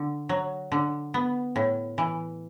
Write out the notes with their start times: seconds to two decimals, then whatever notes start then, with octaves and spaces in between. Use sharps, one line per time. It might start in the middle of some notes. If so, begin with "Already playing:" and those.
Already playing: D3
0.29 F#3
0.72 D3
1.14 B3
1.56 A2
1.98 E3